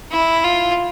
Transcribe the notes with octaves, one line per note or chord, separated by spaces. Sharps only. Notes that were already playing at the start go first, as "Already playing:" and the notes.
E4
F4